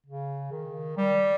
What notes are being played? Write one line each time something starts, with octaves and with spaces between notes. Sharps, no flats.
C#3
D#3
G3